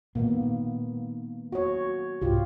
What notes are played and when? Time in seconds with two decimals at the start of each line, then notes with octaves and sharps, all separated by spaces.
0.15 A#2 D#3 G#3 A#3 B3
1.52 F#4 C#5
2.21 C2 G#2 F4 G4